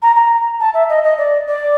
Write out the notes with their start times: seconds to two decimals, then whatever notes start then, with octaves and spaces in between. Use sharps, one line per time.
0.02 A#5
0.16 A#5
0.60 A5
0.73 E5
0.89 D#5
1.04 D#5
1.18 D5
1.47 D5